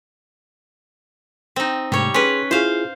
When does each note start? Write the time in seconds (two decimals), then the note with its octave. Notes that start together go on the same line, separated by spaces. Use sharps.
1.56 C4 D#4
1.92 G#2 C3 G3 A3 C#5
2.14 C#4 G#4 B4 C6
2.51 E4 F4 G#4 C5 F5